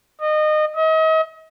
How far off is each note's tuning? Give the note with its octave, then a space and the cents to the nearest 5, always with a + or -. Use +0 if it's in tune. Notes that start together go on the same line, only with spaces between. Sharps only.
D#5 -25
D#5 +40